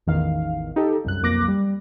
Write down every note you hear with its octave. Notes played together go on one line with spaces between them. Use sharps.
A1 E2 D#3 F5
D#4 G4 A4
C2 F#2 F#6
B1 F2 A#3 D6 F#6 A#6
G3